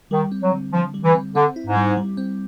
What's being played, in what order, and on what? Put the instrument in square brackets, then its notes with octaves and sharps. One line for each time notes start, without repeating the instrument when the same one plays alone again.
[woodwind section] D#3 [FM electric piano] G3
[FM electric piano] C4
[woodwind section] F#3
[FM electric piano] D3
[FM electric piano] D3 [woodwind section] F3
[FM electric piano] G3
[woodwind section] E3
[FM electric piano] C4
[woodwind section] D3 [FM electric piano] C4
[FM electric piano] E4
[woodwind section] G#2
[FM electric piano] G3
G3
C4